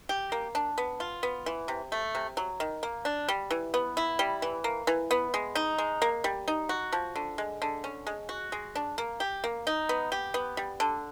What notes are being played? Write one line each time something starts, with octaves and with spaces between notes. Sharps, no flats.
G4
A#3
D4
B3
F4
B3
E3
C3
A3
C3
F#3
D#3
A#3
D4
G3
E3
B3
E4
G3
E3
A#3
E3
B3
G#3
D#4
G#3
A#3
G3
D#4
F#4
F3
D3
G#3
D3
C#4
G#3
F#4
G#3
D4
A#3
G4
A#3
D#4
B3
G4
B3
G3
D3